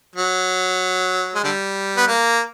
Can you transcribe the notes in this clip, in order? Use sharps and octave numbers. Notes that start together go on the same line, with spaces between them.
F#3
G#3
D3 G3
B3
A#3